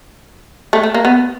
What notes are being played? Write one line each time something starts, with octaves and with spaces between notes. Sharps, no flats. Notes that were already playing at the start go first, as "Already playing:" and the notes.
A3
A3
A#3
B3